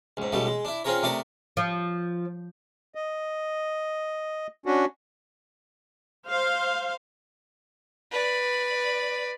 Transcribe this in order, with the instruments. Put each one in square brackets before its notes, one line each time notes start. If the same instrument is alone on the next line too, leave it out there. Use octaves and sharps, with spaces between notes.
[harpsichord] C#2 G#2
C#2 B2 G3 A3
G#3
D4 E4
C4 C#4 F4 G#4 A#4 C#5
C3 A3 D4 A#4 D5 D#6
[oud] F3
[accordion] D#5
C#4 D4 F#4
[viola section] C5 F5
[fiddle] B4 D5